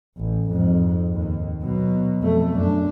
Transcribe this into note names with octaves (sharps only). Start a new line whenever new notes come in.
A1
F2 G#2
D#2
B2 F#3
F2 A3
F#2 D4